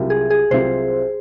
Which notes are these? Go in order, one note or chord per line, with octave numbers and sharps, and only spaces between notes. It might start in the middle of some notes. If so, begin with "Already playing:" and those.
Already playing: C2 C3 F#3 C4 F4
G#4
G#4
C2 C3 F#3 C4 F4 C5